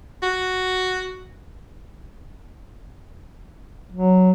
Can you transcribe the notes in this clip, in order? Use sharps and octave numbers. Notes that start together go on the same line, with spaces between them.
F#4
F#3